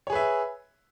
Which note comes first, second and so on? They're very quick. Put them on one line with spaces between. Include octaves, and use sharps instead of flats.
C#5 G#4 B4 E5